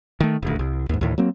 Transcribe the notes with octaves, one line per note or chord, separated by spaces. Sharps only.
D#3 A3
D#1 D2
C2
D#2 G#2
D2 A2 D#3
F#3 A#3 C4